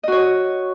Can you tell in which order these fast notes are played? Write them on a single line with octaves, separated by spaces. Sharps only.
D#5 F#4 C#5